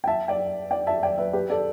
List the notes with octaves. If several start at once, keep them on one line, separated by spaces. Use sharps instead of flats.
G5
E5 A5
D5 G5
D5 G5
E5 A5
D5 G5
B4 E5
G4 B4
A4 D5